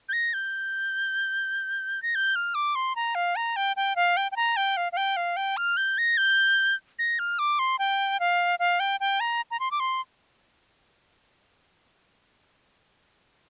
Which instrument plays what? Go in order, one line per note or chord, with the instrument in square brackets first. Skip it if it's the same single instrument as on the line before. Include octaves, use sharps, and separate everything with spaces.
[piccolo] G6
A#6
G6
A#6
G6
F6
D6
C6
A#5
F5
A#5
G5
G5
F5
G5
G5
A#5
G5
F5
F5
G5
F5
G5
F6
G6
A#6
G6
A#6
F6
D6
C6
G5
F5
F5
G5
G5
A#5
A#5
C6
D6
C6